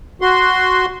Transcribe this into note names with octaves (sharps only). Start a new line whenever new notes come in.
F#4 C6